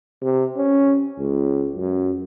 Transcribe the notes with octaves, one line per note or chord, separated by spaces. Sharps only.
C3
C#4
C#2
F#2